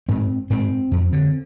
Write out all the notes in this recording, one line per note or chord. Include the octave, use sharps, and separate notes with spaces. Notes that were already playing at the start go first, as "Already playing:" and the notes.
G#2 C4
G#2 C4
F2
D3